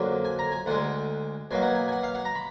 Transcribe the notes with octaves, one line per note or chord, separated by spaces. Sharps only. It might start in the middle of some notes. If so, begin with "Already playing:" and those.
Already playing: F2 D3 F#3 A#3
G#5
A#5
G#5
D2 D3 G#3 F#5
B2 F#3 A#3 G#5
F#5
G#5
G#5
F#5
F5
F#5
A#5
B5